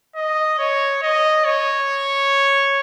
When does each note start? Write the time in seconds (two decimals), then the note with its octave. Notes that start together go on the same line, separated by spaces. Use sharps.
0.15 D#5
0.59 C#5
1.02 D#5
1.45 C#5